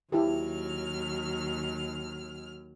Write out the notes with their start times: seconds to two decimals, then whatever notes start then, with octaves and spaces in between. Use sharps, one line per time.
0.12 D#2 F#3 E4 G4 A4 F6